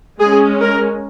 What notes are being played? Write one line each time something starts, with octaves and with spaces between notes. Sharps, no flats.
G#3 C#4 G#4
A#4